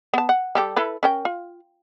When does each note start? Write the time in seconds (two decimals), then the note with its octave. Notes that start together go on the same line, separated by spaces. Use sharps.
0.14 B3 A5
0.29 F#5
0.55 G3 G4 A4
0.76 E4 A4 B4
1.03 C#4 A#4 G5
1.25 F4